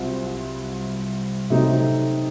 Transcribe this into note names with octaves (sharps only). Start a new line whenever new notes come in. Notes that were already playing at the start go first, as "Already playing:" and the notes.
Already playing: C2 C3 F#3 C4 F4
C3 F#3 A3 C4 D#4